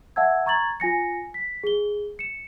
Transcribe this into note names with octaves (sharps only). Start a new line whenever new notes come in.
E5 F#5 A5 E6 G#6
A#5 C#6 G#6 A6 F#7
F4 G#5 A#6 C#7
B6
G#4 G7
C#7 E7